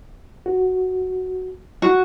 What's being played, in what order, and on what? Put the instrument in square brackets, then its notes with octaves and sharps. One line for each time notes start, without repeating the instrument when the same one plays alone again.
[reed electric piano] F#4
[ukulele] F#4